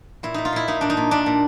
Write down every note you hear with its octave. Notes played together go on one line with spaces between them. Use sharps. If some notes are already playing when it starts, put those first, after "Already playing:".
A#2 E4
A#2 D#4
F4
A#2 E4
A#2 D#4
A#2 D4
D#4
A#2
A#2 D4
A#2